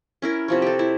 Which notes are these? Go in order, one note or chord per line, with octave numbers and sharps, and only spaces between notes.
C#4 E4 A#4
C3 F3 C#5
G4 A4
E4